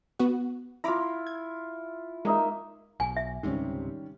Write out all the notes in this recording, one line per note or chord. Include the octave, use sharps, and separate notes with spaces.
B3 F#4
E4 F4 A#5 B5 D6
G#6
G#3 A#3 D#4 E5
B1 G#5
E5
C#2 G#2 C3 D#3 G3 C#4